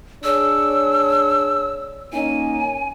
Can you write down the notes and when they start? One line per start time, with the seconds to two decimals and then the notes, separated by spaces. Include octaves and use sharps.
0.24 D4 G#4 C#5 E6
2.13 A#3 C#4 D#4 G#5